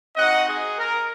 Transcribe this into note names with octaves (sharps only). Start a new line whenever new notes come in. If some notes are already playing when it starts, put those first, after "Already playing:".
C4 D#4 F#4 D#5 F#5
G#4
A#4